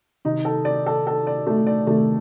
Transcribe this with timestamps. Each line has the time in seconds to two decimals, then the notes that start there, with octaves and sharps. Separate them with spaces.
0.25 C3 D#3 D#4
0.45 A4
0.65 D5
0.86 A4
1.07 A4
1.27 D5
1.47 A3
1.67 D5
1.87 C3 D#3 A3